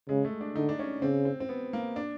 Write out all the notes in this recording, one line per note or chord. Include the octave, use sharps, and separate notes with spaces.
C#3 G#3
A3
D4
D3 D#4
D4
C#4
C#3 C4
C4
C4
B3
A#3
D4